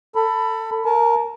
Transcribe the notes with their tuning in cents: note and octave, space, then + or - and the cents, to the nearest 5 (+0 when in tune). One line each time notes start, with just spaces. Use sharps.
A4 +25 B5 +0
A#4 +0 A5 -35